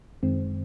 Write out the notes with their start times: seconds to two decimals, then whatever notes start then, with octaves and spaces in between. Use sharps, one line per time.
0.23 F#2 D#3 G#3 C4